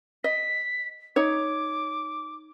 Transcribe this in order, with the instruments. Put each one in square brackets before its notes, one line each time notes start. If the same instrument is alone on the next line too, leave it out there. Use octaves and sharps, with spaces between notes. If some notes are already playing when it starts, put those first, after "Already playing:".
[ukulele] D#5 [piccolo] B6
[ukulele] D#4 C#5 [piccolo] D6